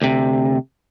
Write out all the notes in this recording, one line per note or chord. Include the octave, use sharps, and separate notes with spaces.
D2 C3